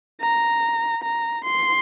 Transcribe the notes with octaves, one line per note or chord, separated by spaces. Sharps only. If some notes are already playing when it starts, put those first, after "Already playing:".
A#5
A#5
C6